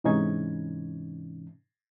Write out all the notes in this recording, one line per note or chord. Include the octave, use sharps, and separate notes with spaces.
G#2 C3 E3 C#4 D#4 G#6